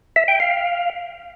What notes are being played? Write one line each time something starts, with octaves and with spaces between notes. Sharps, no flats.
E5
G5
F5